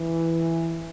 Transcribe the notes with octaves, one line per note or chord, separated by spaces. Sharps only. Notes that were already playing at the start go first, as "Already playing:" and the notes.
Already playing: E3